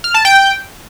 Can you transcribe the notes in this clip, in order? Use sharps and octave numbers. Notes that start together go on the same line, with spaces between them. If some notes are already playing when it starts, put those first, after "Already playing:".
F6
A5
G5